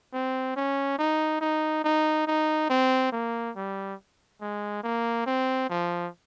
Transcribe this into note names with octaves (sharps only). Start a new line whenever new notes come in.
C4
C#4
D#4
D#4
D#4
D#4
C4
A#3
G3
G#3
A#3
C4
F3